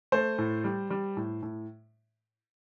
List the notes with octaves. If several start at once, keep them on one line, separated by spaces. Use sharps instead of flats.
A3 C5
A2
G3
G3
A2
A2